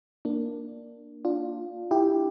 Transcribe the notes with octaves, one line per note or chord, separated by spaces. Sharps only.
A#3 D4
D4 F4
E4 G4